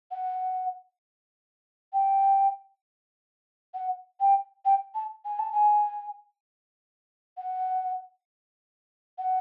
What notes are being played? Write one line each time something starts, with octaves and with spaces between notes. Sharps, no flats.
F#5
G5
F#5
G5
G5
A5
G#5
A5
G#5
F#5
F#5